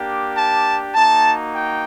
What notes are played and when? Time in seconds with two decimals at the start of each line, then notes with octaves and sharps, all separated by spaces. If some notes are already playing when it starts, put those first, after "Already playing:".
Already playing: A#3 D4 G4
0.36 A5
0.94 A#3 D#4 F#4 A5
1.51 G5